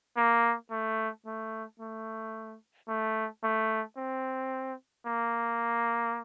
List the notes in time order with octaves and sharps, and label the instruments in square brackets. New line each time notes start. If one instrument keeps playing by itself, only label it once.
[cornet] A#3
A3
A3
A3
A3
A3
C4
A#3